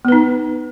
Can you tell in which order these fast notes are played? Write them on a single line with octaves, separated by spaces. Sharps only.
B3 B4 D#4